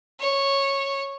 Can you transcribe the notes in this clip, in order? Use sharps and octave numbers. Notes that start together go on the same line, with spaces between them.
C#5